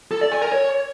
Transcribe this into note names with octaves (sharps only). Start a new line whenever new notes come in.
A4
D5
G#5
A#4
C#5